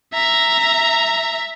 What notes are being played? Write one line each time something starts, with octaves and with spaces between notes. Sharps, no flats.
E5 A#5